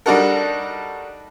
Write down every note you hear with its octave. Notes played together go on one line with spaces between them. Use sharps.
G3 D4 D#4 F#4 A4 A#4